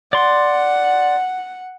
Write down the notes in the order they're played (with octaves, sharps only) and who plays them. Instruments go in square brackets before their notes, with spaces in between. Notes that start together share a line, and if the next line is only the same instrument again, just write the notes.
[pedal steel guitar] D5 C6 [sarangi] F#5